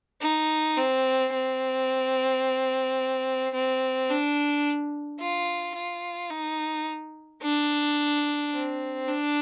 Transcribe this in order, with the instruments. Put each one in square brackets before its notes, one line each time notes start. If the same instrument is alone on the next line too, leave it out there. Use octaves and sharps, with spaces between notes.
[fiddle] D#4
C4
C4
C4
D4
F4
F4
D#4
D4
C4
D4